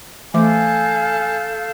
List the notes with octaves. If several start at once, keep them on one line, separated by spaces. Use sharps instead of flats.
E3 A3 A4 F5 G#5 D6 G6